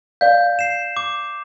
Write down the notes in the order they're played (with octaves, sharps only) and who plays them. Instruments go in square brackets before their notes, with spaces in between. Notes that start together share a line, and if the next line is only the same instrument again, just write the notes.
[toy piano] D5 F5 [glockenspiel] G6
[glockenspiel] C7 E7
D6